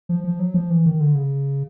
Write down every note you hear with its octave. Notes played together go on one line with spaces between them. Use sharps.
F3
F3
F#3
F3
E3
D#3
D3
C#3